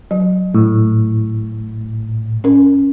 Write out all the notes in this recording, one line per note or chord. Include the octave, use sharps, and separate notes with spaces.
F#3
A2
C#4 A#4